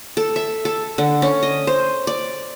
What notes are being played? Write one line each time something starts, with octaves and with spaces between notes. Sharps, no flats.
A4
E5
A4
D3
C#4
D#5
C5
D5